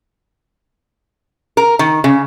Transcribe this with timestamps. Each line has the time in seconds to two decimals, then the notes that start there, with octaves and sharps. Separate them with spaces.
1.57 A#4
1.79 D#3
2.04 C#3